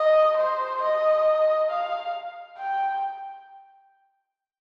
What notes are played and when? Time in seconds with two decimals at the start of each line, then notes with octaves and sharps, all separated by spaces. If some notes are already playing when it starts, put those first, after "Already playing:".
Already playing: D#5
0.37 C5
0.82 D#5
1.70 F5
2.58 G5